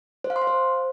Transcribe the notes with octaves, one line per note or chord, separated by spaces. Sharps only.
C5
F5
C6
F5
C5